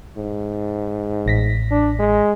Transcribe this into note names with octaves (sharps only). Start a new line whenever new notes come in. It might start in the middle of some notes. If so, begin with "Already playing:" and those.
G#2
A1 A#6 B6
D4
G#3